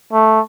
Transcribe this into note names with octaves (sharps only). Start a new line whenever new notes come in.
A3